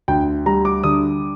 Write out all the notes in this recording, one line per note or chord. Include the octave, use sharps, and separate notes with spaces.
D2 G5
G3 A#5
D6
D3 D#6